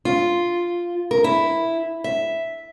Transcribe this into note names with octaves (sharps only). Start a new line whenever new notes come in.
F4
A#4
E4
E5